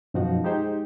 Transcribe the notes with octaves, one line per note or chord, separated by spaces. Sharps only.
F#2 B2 F3 D#4 F#4 F#5
G#3 D#4 G4 G#4 C5 G5